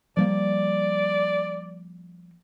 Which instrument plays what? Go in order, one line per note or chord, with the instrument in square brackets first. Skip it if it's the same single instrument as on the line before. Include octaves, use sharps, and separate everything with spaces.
[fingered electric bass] F3 G3 A#3 [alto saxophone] D5